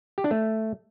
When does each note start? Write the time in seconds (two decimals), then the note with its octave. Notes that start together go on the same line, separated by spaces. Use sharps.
0.18 G4
0.24 D4
0.31 A3